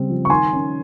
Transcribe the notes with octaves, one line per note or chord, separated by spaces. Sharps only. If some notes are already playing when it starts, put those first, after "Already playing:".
Already playing: C#3 G3 C4
F3
C#6
D#3 G#5 C6
C#4